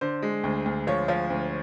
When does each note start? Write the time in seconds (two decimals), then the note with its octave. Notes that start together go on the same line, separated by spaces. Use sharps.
0.01 D3 C5
0.23 G#3
0.44 D2
0.66 D2
0.87 F3 C#5
1.08 F3
1.30 D2